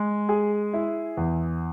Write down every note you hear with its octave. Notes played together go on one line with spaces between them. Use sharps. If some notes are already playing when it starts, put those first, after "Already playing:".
Already playing: G#3
G#4
E4
E2